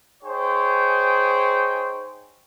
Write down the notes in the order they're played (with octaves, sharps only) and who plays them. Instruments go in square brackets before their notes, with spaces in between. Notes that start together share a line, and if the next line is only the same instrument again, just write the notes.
[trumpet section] D#4 G#4 C5 C#5 G5